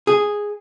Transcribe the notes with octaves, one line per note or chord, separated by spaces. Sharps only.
G#4